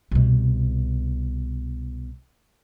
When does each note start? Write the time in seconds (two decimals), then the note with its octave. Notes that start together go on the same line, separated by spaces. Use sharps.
0.11 C2 B2